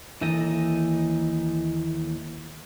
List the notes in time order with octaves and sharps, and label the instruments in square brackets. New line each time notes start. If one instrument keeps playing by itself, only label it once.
[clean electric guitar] D#2 E3 D#4 A4 D#5